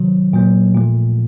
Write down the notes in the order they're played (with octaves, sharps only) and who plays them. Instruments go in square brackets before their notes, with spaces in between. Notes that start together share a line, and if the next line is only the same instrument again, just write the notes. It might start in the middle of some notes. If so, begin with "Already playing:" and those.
Already playing: [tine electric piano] C3 D#3 F#3
A#2 F#3 A#3
A#2 F3 A3